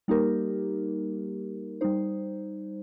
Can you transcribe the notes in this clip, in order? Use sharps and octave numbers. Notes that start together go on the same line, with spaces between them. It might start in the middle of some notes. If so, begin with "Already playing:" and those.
G3 A#3 D#4 G4 A#4
G3 D#4 C5